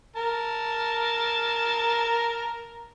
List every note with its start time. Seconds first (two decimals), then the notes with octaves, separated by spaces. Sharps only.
0.16 A#4 A5